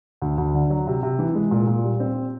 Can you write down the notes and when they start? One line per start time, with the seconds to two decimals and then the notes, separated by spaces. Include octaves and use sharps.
0.22 D2
0.38 D2
0.54 D3
0.70 F#3
0.87 C3
1.03 C3
1.19 E3
1.35 G#3
1.51 A#2
1.67 A#2
1.84 G3
2.00 C4